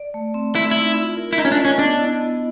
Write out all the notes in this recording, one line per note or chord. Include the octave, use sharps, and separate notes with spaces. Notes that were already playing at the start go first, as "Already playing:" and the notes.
Already playing: D5
A3
C4
A3 E4
E4
D#4
F4
A#4
E4
D#4 F4
C#4
D4
D#5
C#4
B3 D4
E4
B3